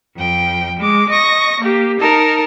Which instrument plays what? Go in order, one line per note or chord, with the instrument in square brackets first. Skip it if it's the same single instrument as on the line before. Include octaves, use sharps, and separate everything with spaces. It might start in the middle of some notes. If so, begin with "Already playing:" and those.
[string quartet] F2 G5
G#3 D6
D#5 C#6 A#6
A#3 G4
D#4 A#4 A5